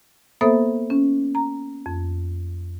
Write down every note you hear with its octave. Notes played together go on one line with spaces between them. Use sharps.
A#3 B3 A4 C5 E5 D#6
C#4
A#5
F2